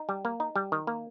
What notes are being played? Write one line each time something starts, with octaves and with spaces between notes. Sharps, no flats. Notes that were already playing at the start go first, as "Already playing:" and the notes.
Already playing: D#4
G3
A#3
D#4
G3
D#3
A#3